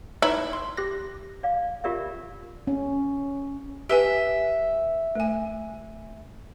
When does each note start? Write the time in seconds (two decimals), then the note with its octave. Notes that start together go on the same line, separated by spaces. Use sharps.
0.22 D#4 E4 B4 C#5
0.53 C6
0.77 G4 F#6 A#6
1.43 D5 F5
1.84 F4 G4 A#4 D5 E5
2.67 C#4
3.89 G4 B4 E5 G#5
5.15 A3 G#5